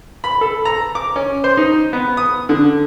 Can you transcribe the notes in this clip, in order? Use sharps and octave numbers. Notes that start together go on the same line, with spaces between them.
B5
A4
A#5
D6
C#4
C5
D#4
B3
D#6
D3